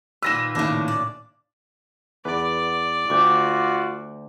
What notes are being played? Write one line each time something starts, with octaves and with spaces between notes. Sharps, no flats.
A#2 D#3 B4 E6 A#6 E7
D#2 A2 C#3 D4
D5
E2 B4 D5
D2 F4 F#4 G5 D6